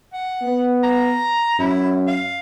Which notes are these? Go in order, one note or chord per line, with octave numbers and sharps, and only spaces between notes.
F#5
B3
A#5
F#2 E4
F5